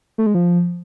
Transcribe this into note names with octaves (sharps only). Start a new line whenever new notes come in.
A3
G#3
F3